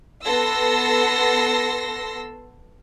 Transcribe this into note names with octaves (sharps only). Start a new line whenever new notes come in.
B3 A4 C6 E6 A#6